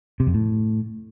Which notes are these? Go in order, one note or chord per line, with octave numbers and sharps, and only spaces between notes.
C3
F2
A2